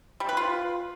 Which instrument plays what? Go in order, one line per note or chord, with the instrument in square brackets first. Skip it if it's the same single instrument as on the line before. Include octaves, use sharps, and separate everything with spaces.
[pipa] G3
B4
F4